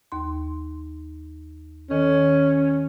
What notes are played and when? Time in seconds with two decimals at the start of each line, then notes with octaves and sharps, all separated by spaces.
0.12 D#2 C6
1.90 D#3 C#4 A4